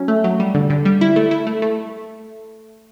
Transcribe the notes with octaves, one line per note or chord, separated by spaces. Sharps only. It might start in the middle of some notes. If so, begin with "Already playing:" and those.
Already playing: F#3 C#4
A3
F#3
G3
D3
D3
G3
E4
A3
E4
A3
A3